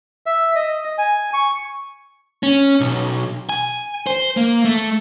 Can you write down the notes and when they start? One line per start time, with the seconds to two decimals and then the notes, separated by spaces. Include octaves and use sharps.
0.26 E5
0.55 D#5
0.98 G#5
1.34 C#6
2.43 C#4
2.80 B1
3.49 G#5
4.07 C5
4.37 A#3
4.64 A3